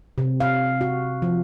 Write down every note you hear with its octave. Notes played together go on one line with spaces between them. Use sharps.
C3
F5
F#4
F3